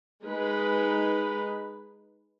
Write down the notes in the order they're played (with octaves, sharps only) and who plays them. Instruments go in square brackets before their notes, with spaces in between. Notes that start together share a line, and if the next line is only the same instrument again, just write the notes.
[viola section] G#3 D#4 B4